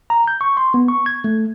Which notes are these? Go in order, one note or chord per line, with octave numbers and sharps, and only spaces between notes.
A#5
G6
C#6
C6
B3
C#6
G#6
A3